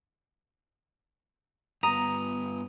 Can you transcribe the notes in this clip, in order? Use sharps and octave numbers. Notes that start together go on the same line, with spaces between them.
G2 B3 A#5 D#6 D#7 F7